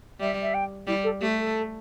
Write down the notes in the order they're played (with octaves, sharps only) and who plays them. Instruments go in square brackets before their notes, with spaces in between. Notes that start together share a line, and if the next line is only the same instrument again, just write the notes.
[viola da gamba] G3 [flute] E5
[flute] E5
G5
[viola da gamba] G3 [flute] E4
[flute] A4
[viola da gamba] A3 [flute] G4
[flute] A4